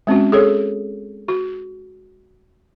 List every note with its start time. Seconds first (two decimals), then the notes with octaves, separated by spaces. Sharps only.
0.07 G#3 C4 C#4 F#4
0.32 G#4 A4 C#5
1.28 F#4